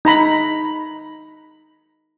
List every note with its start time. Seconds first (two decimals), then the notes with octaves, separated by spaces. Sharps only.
0.05 D#4 A#5 B5